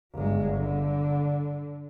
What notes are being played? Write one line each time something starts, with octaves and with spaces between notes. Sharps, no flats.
G1 G#3
D3